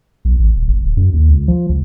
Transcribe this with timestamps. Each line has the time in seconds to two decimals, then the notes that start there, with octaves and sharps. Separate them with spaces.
0.25 B1
0.39 G#1
0.56 D#1
0.68 G1
0.84 D1
0.97 F#2
1.13 D#2
1.29 C#2
1.48 F3
1.69 C#2